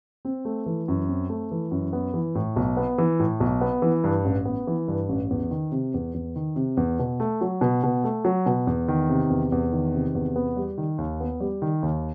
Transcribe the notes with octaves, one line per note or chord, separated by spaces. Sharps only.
C4
A3
E3
F#2
C4
A3
E3
F#2
B3
E3
A2
B1
B3
E3
A2
B1
B3
E3
G2
A1
B3
E3
G2
A1
E2
D#3
C3
E2
E2
D#3
C3
E2
B2
A3
F#3
B2
B2
A3
F#3
B2
E2
D#3
C3
E2
E2
D#3
C3
E2
B3
G3
D#3
D#2
B3
G3
D#3
D#2